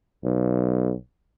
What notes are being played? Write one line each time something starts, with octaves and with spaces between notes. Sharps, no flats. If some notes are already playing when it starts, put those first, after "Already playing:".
B1